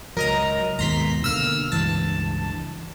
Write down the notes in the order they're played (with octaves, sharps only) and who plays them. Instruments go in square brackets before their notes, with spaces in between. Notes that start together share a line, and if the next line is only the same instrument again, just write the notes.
[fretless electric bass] C#2 F#3 [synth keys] A#4 D#5 A#5
[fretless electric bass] D#2 G#2 B2 [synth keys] A#5 C6 B6
[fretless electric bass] B2 D3 A#3 [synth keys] E6 F6
[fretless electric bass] C#2 G2 E3 [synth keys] A5